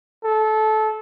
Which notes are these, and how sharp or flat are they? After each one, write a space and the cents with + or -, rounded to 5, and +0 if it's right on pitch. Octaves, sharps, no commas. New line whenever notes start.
A4 -20